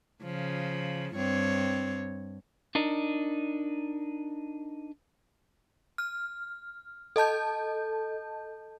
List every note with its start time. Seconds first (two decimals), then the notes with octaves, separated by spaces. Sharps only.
0.23 C#3 F3
1.16 G2 C4 C#5
2.75 D4 D#4 A#4
5.98 F6
7.16 A4 D#5 A5 G6